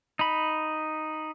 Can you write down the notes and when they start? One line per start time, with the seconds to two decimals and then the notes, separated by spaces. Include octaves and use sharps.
0.19 D#4 B5